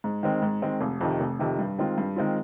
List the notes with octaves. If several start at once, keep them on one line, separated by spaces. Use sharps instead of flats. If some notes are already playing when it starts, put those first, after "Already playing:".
G#2
D#3 G#3 C4
G#2
D#3 G#3 C4
F1
F2 C3 D#3
F1
F2 C3 D#3
G2
D#3 G#3 C4 F4
G2
D#3 G#3 C4 F4